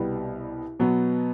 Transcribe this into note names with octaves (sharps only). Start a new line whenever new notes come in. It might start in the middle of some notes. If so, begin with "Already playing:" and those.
Already playing: C2 B2 G3 B3
B2 F#3 B3